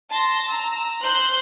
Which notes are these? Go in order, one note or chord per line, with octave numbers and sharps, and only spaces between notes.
A5 C6 A#6
A#5 E6
C5 F#6 G6